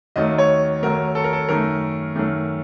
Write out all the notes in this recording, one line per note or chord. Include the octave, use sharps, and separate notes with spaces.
D#2 D#3 F#3 A3 D#5
C#5
D#2 D#3 F#3 A3 A#4
A4
A#4
A4
F#2 D#3 A3 A#4
F#2 D#3 A3